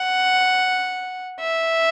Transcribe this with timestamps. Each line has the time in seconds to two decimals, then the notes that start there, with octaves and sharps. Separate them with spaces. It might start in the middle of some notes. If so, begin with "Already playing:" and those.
Already playing: F#5
1.40 E5